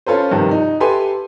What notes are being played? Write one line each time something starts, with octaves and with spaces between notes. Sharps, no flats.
C#4 F4 A4 B4 C5
G2 C3 D#3 F3
D#4
G4 A4 B4 E5 G#5 C6